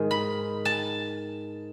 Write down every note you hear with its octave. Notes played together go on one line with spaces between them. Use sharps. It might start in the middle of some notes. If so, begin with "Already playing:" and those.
Already playing: G#2 D#3 G#3 D#4
B5
A5